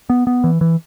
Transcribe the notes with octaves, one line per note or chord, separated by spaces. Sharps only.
B3
B3
E3
E3